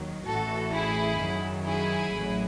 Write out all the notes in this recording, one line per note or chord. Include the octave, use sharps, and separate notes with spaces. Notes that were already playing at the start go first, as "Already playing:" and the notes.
Already playing: D#2 D#3 F#3
A1 A2 E3 F#4 A4
E4 G#4
F#2 D#3 F#3
E4 G#4
A1 A2 F#3